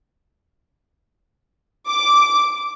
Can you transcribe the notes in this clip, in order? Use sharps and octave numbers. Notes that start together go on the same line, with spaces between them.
D6